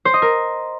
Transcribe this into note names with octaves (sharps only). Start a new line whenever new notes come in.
C5
D#5
A#4